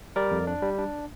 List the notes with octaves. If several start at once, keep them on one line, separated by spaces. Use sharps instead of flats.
G3 A#4 D5
F2
D4
G3
D4